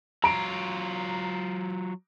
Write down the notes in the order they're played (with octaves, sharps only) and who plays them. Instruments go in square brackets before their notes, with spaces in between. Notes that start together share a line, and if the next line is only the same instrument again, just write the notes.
[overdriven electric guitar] F#3 F4 [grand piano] A#5 D7